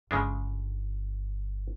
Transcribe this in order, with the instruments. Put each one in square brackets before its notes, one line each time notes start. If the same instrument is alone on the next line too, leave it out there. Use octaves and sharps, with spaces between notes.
[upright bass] G1 [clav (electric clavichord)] C#3 G#3 D4